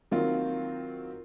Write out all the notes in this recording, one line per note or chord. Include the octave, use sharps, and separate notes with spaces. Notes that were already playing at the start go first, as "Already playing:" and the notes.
D#3 F#3 A#3 C4 F4